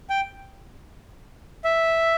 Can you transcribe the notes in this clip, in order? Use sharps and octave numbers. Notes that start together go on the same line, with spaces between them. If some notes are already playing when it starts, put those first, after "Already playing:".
G5
E5